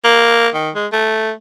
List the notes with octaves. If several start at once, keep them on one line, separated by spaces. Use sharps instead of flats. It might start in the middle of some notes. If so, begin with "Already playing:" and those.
A#3
D#3
G#3
A3